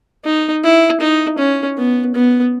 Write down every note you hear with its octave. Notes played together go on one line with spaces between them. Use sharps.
D#4
E4
D#4
C#4
B3
B3